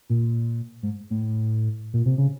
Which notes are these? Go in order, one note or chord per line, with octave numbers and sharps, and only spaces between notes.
A#2
G#2
A2
A#2
C3
C#3